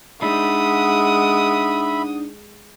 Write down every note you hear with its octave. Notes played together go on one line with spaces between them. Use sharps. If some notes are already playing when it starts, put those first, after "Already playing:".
G#3 D4 D#4 E5 F#5 B5 D#6